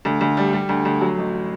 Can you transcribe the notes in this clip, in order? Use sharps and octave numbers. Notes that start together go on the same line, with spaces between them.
D2
D2
G3
G3
D2
D2
F#3
A1